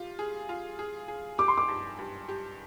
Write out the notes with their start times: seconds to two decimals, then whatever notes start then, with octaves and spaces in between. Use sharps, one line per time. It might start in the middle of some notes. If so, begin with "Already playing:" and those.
Already playing: G3 F4
0.19 G#4
0.49 F4
0.79 G#4
1.08 G#4
1.38 G4 D6
1.48 C6
1.57 D6
1.68 G2
1.99 G2
2.29 G4